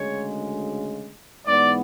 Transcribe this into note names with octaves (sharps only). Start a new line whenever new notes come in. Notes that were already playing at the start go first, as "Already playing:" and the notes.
Already playing: D2 C#3 G#3 C#5
G#2 E3 B3 D5